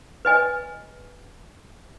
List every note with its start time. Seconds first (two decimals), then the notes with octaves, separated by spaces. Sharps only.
0.25 B4 D#5 G#5